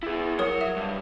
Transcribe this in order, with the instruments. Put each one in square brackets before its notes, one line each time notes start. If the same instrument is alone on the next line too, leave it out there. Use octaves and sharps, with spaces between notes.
[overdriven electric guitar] E4 G#4
[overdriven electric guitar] F#3 F#5 [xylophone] A#4 C#5 D#6
[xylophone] E5
[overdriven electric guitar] G2